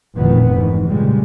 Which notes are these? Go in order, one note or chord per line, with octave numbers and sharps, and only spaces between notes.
F1 A#2 D#3 E3 B3
G#2 D#3 E3
A#2 C#3 G3 G#3